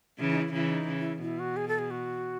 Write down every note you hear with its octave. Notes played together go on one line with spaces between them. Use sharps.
C#3 E3
D#4
E4
C#3 E3 E4
D#4
C#3
E4
B2 E4
F#4
G#4
A4
G#4
F#4